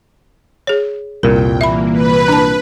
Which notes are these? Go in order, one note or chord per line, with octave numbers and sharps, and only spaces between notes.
G#4 C#5
C2 F2 A#2 A#4 G5
E3 A#3 E5 B5
B4
D4 A5